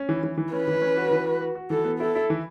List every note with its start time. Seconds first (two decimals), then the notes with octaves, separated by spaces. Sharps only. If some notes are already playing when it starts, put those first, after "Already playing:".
Already playing: C#4
0.09 E3
0.23 E3
0.38 E3
0.53 C#4 B4
0.68 E3
0.82 C#4
0.97 F#4
1.11 E3
1.26 F#4
1.41 F#4
1.55 F#4
1.70 E3 A4
1.85 B3
2.00 E4 A4
2.15 E4
2.30 E3